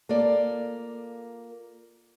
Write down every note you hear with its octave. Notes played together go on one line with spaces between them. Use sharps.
A#3 F4 A4 D5